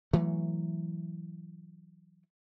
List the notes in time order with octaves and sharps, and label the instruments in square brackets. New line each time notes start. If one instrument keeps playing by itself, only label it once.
[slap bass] E3 F#3 A3